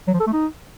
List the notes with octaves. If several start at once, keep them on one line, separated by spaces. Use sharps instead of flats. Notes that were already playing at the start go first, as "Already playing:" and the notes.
F#3
F3
A4
A3
D#4